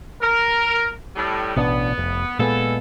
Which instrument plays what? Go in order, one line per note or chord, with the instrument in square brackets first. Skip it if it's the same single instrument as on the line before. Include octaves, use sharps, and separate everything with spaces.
[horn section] A#4
A2 G3
[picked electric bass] A1 B2 D4 [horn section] B3
[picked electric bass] F1
[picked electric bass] A#2 G#3 B3 [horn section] E3 A4